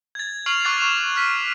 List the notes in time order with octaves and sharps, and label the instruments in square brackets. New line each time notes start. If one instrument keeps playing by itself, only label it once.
[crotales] G#6 A6
C#6 F6 C7 F7 F#7
C#6 D6 F#6 A6 C7
C#6 E7 F7
F6 B6 D#7